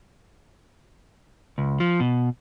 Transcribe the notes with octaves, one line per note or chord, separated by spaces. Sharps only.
C#2
F3
B2